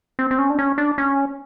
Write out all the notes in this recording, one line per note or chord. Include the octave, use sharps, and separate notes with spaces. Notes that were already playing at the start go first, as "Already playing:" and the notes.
C4
C4
C#4
D4
C#4
D4
C#4